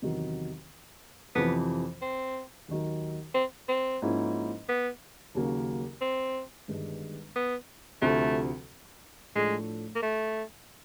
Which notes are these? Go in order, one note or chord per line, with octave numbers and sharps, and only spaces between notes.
E2 C3 D#3 F#3
F2 C3 E3 B3
C4
D#2 D#3 F#3
C4
C4
G#2 F3 A#3 C#4 E4
B3
D#2 C#3 F#3 A#3
C4
G1 G2 D#3 G#3
B3
D2 C3 F3 A3
A2 F3 G#3 A3 D4
A#3
A3